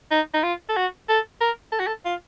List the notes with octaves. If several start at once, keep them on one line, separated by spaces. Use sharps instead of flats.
D#4
D#4
F4
A4
F#4
A4
A#4
A4
F#4
A4
F4